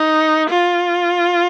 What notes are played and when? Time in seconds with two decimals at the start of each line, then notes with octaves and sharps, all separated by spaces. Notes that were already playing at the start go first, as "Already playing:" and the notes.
Already playing: D#4
0.49 F4